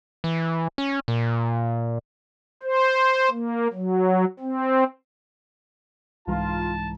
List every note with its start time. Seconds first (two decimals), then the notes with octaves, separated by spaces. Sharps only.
0.24 E3
0.78 C#4
1.08 A#2
2.63 C5
3.31 A#3
3.73 F#3
4.40 C4
6.27 C2 G#2 E3 F4 A5 A#5